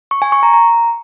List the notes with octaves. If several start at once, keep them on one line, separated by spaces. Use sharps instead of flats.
C#6
G#5
C#6
A#5
A#5